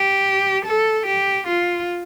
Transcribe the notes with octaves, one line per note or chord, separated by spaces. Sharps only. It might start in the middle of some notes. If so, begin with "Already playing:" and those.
Already playing: G4
A4
G4
F4